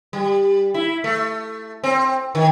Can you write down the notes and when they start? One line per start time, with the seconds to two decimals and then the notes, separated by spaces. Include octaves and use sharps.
0.13 G3
0.74 E4
1.04 A3
1.84 C4
2.35 D#3